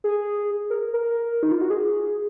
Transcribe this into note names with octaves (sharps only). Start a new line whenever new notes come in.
G#4
A#4
A#4
D#4
F4
F#4
G#4